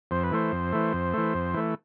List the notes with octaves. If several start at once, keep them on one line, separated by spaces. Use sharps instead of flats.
F2 C5
B4
E3 A3 C5
F2
E3 A3
F2
E3 A3
F2
E3 A3